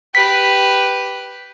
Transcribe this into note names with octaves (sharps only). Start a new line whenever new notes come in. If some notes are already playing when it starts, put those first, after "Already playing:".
G4 B4 B6